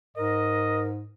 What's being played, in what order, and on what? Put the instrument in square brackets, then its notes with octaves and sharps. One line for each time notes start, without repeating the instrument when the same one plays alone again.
[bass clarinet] G#2 [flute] A#4 [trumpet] D#5